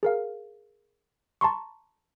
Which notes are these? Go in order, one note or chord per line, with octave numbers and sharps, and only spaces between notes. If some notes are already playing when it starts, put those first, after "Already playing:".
G#4 A#4 F5
A5 A#5 C6 C#6